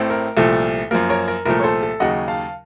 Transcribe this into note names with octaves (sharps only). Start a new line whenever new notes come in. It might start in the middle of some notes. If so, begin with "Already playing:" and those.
Already playing: A1 A2 A3 C4
A#4
C2 A#2 F3 A3 A4
F#2 F3 A#3 A#4
A#4 C#5
A#4
C2 A#2 F3 A3 A#4
C#5
A4 C5
A4
D#2 C#3 F#3 D#5 F#5
F5 A5